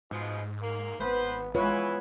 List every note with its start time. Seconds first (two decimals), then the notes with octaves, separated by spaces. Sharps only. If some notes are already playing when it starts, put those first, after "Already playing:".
0.11 G#2 B2 F3 G#3
0.61 A#3
0.99 G#1 B3 B4 C5
1.55 E3 G#3 B3 F4 B4 C#5